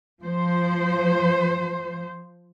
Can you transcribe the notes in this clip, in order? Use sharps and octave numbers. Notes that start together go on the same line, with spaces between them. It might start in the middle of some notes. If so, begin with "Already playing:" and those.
F3 C5